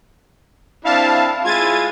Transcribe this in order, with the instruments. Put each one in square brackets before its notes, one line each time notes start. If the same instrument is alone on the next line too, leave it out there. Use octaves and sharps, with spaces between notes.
[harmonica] C4 D4 E4 [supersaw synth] F5 A5
[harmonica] G#3 E4 F4 [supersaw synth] G#6 A6 D#7